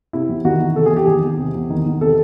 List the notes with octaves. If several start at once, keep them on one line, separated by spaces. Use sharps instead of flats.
C3 E4
E2
D#3 F#4
E2
C3 A4
G#4
E2 G4
D#3 G#4
E2
C3
E2
D#3
E2
C3 A4